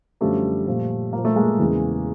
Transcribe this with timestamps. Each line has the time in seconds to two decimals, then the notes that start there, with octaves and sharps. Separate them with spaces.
0.21 F#2 D3 F3 G3 A3
0.67 A#2 F3
1.13 A#2 F3 A#3
1.25 A3
1.36 G#3 A#3
1.59 E2 C#3 E3